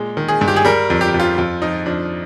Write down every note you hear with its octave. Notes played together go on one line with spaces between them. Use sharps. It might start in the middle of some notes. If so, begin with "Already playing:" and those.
Already playing: A#2 G#3
D#3
G#4
G2
G4
G#4
G3 A#4
F2
G4
F2
F4
F2 F4
F3 D#4
F2 D4